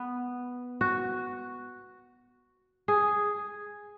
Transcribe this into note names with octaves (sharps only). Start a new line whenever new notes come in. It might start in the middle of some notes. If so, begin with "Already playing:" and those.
Already playing: B3
F#4
G#4